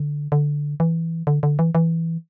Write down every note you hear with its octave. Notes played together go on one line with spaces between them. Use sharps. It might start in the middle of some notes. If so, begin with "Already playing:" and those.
Already playing: D3
D3
E3
D3
D3
E3
E3